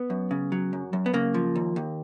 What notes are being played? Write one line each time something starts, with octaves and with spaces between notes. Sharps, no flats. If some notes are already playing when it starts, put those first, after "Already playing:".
Already playing: B3
F#2
C#3
F#3
F#2
F#2
B3
C#3 A#3
F3
D#2
D#2